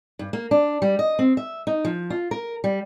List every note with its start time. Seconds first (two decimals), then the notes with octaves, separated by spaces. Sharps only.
0.19 G2
0.33 A#3
0.51 D4
0.82 G3
0.99 D#5
1.19 C4
1.37 E5
1.67 D#4
1.85 F3
2.10 F4
2.31 A#4
2.64 G3